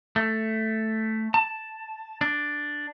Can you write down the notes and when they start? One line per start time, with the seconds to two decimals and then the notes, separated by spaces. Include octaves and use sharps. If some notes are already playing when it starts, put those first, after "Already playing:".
0.16 A3
1.34 A5
2.21 D4